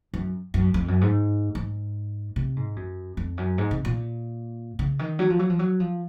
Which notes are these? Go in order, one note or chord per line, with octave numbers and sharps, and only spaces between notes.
F#2
F#2
F2
F#2
G#2
G#2
C3
G#2
F#2
F2
F#2
G#2
C3
A#2
C#3
D#3
F#3
F3
F#3
F3
F#3
F3